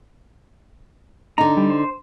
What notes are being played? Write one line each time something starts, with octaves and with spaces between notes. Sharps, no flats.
D3 D#4 A#5
G3
C5